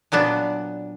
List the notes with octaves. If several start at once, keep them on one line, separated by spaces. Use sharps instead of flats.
A#2 F#3 B3 D4